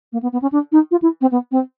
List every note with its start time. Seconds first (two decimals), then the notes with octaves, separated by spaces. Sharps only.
0.12 A#3
0.22 B3
0.32 B3
0.42 C#4
0.52 D4
0.72 D#4
0.91 F4
1.02 E4
1.21 C4
1.31 B3
1.51 C4